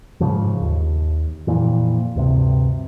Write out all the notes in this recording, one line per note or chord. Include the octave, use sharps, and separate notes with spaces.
G#2 C#3 F3
D#2
F2 A#2 E3
D2 G2 C3